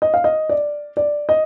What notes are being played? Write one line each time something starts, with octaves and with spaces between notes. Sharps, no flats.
D#5
F5
D#5
D5
D5
D#5